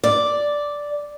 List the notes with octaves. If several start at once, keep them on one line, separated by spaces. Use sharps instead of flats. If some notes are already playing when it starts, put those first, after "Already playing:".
D5